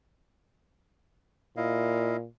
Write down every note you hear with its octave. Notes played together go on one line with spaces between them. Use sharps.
A#2 E4 D#5 F5